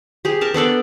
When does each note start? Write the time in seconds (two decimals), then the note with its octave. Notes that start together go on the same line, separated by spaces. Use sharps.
0.25 G4 G#4
0.41 A#4 A5
0.54 B3 D4 A4 D5